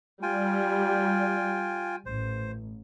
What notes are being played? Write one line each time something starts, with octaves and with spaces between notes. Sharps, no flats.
G3 F4 G5 G#5
A1 C5